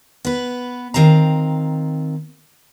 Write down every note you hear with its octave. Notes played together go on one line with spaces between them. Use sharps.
B3 B4
D#3 C4 F5 A#5